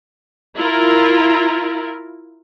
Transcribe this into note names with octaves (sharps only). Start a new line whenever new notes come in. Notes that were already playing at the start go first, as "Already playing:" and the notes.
E4 F4 A#4